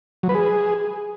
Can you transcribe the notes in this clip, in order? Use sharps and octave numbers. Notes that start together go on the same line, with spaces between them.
F#3
B4
G#4